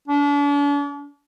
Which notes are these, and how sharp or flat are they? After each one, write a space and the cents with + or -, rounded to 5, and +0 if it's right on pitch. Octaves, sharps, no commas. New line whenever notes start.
D4 -40